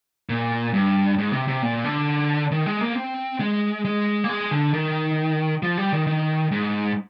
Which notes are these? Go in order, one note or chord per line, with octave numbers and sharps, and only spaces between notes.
A#2
G2
G#2
C3
C3
A#2
D3
D#3
G#3
A#3
C4
G#3
G#3
A#3
G#3
D3
D#3
F3
G3
D#3
D#3
G#2